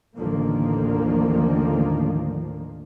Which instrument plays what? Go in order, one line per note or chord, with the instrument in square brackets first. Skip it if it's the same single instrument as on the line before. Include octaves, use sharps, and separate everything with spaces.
[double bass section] A1 D#2 D3 D#3 F3 A#3